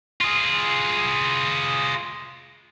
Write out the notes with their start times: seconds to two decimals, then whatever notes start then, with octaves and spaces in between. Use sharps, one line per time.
0.21 F4 G#4